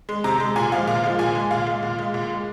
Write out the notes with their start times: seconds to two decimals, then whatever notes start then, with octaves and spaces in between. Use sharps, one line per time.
0.09 G#3
0.24 C3 A#5
0.40 G#3
0.56 A#2 G#5
0.72 F3 G#3 F5
0.87 A#2 F5
1.04 F3 G#3
1.19 A#2 G#5
1.35 G#3
1.51 A#2 F5
1.67 G#3
1.83 A#2
1.98 G#3
2.14 A#2
2.29 G#3